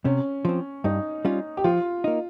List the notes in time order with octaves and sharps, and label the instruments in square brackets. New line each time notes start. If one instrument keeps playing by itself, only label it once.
[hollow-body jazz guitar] C3 [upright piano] C#4
[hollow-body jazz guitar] F3 C4
[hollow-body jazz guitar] G2 [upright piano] D#4
[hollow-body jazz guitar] G3 C#4 F4
[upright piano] G4
[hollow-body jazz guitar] F3 [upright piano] F4
[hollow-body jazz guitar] A#3 D#4